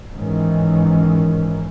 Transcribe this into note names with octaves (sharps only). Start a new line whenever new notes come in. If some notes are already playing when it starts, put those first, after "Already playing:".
G#2 D#3 E3 C#4